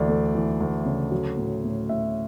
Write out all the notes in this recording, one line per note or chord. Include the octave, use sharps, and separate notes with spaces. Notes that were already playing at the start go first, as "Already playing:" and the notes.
Already playing: D2 E3 D5
A3
E3
D2
C#3
F#3
A2
A2
A2 E5